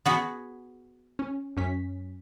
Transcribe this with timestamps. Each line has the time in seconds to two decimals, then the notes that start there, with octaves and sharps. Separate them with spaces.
0.06 B3 F#4 G#4
1.19 C#4
1.57 F#2 C#4 B6